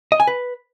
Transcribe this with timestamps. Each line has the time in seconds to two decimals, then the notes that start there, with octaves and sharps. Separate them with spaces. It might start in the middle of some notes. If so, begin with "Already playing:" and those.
0.12 D#5
0.20 G#5
0.27 B4